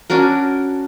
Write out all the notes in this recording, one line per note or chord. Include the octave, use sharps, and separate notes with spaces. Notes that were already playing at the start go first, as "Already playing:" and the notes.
C#4 D4 F#4 A#4